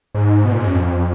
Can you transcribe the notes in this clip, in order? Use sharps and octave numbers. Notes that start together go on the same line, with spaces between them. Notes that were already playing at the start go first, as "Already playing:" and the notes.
G#2
B2
A#2
G#2
F#2
F2